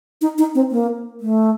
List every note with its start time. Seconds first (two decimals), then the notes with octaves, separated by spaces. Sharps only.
0.21 D#4
0.38 D#4
0.55 C4
0.72 A#3
1.21 A3